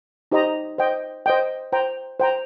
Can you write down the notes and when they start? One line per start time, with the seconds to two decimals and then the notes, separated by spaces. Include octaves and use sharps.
0.32 D#4 G4 C5 D#5 A#5
0.78 C5 D#5 G5
1.26 C5 D#5 G5
1.72 C5 G5 A#5
2.20 C5 G5 A#5